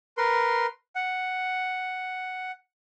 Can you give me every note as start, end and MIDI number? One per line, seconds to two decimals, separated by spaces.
0.17 0.66 70
0.17 0.66 71
0.17 0.66 84
0.96 2.51 78